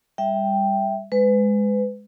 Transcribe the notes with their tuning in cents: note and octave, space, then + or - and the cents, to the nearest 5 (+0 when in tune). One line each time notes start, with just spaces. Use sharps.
G3 +25 E5 +0 G5 +0
G#3 +0 B4 +30